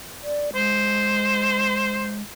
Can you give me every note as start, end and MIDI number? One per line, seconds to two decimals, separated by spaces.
0.23 0.55 74
0.55 2.22 56
0.55 2.15 72